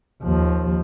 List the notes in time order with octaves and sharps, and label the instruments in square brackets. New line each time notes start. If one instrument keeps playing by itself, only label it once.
[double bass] D#2 F3